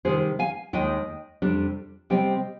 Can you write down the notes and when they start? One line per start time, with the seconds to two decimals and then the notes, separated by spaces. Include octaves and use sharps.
0.05 C3 D#3 G3 G#4 C5
0.39 F5 G#5
0.73 D#2 D#3 G#3 D#5 G5
1.42 F2 C3 G3 D4
2.10 C3 G3 C4 D#5 G5